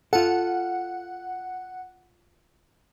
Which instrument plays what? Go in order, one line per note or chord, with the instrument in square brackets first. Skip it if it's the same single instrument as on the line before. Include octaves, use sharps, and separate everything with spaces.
[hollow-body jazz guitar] F4 A4 [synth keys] F#5